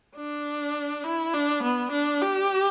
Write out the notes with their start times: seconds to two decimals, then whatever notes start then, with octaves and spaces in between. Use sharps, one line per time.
0.16 D4
1.04 E4
1.34 D4
1.63 B3
1.92 D4
2.21 G4